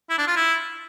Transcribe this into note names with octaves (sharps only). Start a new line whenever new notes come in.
E4
D4
F4
E4